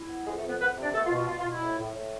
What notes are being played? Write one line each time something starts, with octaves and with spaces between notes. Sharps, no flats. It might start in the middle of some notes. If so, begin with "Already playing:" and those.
Already playing: E4
B3
F2 G#3 G#4
A3 A4
F2
B3 B4
F2 B3 B4
C3
D4 D5
B2 A3 A4
F4
B2
F4
B2 F4
F4
B2 E4
A2
A2
A2